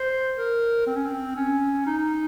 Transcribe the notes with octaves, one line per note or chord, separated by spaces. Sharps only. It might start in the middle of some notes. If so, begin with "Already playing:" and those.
Already playing: C5
A#4
C4
C#4
C4
C#4
D#4